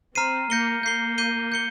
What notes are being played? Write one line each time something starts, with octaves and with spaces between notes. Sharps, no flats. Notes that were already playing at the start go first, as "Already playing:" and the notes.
C4 A#5 F6 C7 D#7
A#3 G6 A#6 C#7 G7
A#3 G6 C7 G7
G6 C7 D#7 G7
G6 C#7 G7